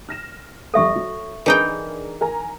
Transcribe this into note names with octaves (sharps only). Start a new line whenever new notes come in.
F6 A#6 E7
F2 G3 A4 E5 C#6 D#6
F#3
E3 D4 D#4 G#4 A#4 G5
A#4 G#5 A#5